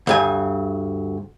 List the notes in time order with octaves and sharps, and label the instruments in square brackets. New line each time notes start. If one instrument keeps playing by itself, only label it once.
[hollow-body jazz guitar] D2 G2 G#5